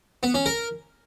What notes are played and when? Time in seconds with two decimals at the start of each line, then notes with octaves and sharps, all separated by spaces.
0.23 B3
0.34 C#4
0.46 A#4